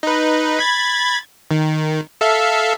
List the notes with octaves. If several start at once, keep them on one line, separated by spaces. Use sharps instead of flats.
D#4 B4
B5 G#6 A6
D#3
A4 E5 F5